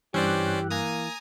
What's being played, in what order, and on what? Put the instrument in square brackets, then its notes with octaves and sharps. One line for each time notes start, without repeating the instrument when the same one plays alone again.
[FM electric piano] G2 F#6 [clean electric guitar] E3 [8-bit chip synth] C#4 C5 D5 [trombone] G4
[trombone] A#3 [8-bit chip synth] G#5 A#5 D#6